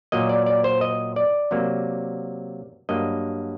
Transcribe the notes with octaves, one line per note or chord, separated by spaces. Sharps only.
A#2 F#3 A#3 D#5
D5
D5
C5
D#5
D5
C3 F#3 A#3
G2 F#3 A#3 D#5